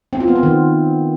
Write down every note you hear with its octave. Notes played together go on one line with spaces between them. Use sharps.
C4
F4
B3
C4
D#3